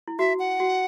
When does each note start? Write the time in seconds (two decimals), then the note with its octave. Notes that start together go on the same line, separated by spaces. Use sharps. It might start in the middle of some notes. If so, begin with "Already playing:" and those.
0.08 E4
0.19 F#4 E5
0.39 F#5
0.60 F#4